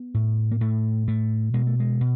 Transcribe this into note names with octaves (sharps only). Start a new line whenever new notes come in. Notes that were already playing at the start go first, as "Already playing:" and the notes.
Already playing: B3
A2
A#3
A2 A3
A2 A3
B2 G#3
A3
G#3
B2